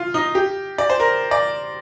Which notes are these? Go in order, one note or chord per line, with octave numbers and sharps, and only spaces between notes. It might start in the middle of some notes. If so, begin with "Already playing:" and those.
Already playing: F4
D#4
G4
D5
C5
A#4
D5